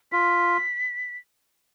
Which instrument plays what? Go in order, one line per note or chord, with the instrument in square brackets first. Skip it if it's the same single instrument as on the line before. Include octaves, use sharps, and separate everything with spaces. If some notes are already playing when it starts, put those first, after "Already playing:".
[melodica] F4 [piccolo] B6